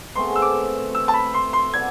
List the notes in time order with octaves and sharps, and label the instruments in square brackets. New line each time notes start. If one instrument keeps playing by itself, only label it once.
[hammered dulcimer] B2 A3 C4 G#4 [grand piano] C6
[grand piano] E6
D6
E6
A5
B5
C6
C6
[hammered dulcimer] F3 B3 D4 [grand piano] G#6